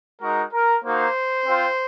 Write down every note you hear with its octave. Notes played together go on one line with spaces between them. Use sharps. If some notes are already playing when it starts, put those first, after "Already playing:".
G#3 D#4 F#4 A#4
A#4
A#3 D#4 F#4 C5
C4 F4